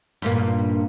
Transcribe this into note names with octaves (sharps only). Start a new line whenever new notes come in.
G2 A#2 A#3